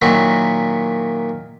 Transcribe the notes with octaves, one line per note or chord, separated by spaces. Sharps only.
A#2 D#3 F#3 E4 F#4